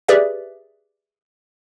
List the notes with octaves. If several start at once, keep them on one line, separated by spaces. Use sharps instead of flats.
G4 G#4 B4 D5 E5